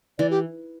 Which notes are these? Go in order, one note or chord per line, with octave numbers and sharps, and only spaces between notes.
E3 D5
G4